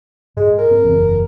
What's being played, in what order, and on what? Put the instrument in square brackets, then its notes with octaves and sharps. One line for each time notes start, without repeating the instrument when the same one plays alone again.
[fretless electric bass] G#2 [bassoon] G#3
[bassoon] A#4
[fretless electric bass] C4
F#1 E2